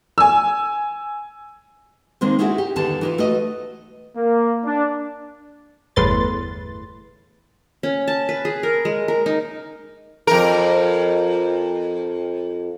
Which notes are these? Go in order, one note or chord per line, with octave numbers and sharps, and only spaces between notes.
G#5 E6
D#3 G#3 A#3 C4
C#4 D#4 E4 F#4 G#4 A#4
G4
E2 D3 D#3 A5
E3 D#4 F4
A3 F#4 B4 D#5
A#3
D4
G1 E2 A2 B4 C6 A6
C#4
A5
B4
G#4
A#4
G#3
A#4
D#4
F2 A#4